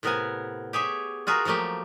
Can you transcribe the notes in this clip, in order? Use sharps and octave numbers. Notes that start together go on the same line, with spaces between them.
A2 C3 B3 A#4 F#5 G#5
G4 G#4 C#5 E5
F4 F#4 G#4 A#4 E5
F3 F#3 A3 A#3 G4